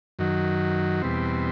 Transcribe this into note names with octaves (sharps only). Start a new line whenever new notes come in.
F#2 D#3 F#3
E2 B2 G3 C4